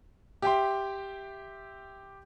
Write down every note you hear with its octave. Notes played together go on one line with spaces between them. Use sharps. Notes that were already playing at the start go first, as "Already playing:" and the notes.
G4 E5 G5 C6